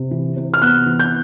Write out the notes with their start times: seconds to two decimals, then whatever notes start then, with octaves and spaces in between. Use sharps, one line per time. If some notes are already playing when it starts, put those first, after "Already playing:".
Already playing: C3
0.11 E3
0.36 C3
0.54 F6
0.62 B3 F#6
0.86 E3
0.99 G6